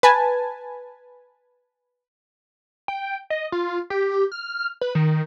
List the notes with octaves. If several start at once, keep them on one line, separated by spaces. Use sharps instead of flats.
B4 G#5 A5
G5
D#5
F4
G4
F6
B4
D#3